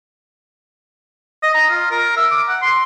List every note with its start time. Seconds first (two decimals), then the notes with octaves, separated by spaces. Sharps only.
1.43 D#5
1.55 A#5
1.70 F4
1.91 A#4
2.17 E5
2.31 D6
2.49 F#5
2.62 C6